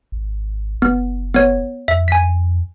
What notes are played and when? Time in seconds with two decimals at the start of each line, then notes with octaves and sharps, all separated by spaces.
0.12 G#1
0.82 F#1 B3
1.34 B3 C#5
1.88 F2 E5
2.08 G#5 B6